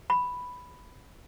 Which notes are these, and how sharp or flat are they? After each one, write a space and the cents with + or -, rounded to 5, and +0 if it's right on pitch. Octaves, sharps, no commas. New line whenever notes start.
B5 +5